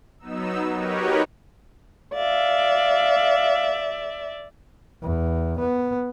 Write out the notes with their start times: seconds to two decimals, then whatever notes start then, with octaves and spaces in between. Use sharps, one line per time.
0.19 F#3 B3 D#4 E6
0.74 D#4 F#4 G4 A#4 B4 C#5
2.14 D5 E5 F5
5.02 E2
5.59 B3